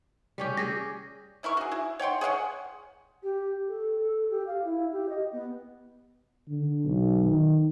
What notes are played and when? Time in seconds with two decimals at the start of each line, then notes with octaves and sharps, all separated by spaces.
0.38 G3 C#4 G4
0.57 G4 G#4 A#6
1.43 C#3 E4 A#4 C#6
1.57 F#4 G#4
1.72 E4
1.99 C#5 F#5 G5 C6
2.21 G#4 C#5 F5 F#5
3.23 G4
3.68 A4
3.98 A4
4.30 G4
4.47 F5
4.64 E4
4.93 G4
5.09 D#5
5.32 B3
6.48 D3
6.84 B1
7.25 D#3